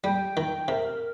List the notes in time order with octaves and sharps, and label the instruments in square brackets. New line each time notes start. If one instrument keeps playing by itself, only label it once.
[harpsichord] G3 [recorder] G5
[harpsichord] D#3
[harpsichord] C3 [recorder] A#4